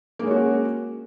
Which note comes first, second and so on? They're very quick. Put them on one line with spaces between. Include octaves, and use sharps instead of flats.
A#3 G#3 C#5 F#4 C#4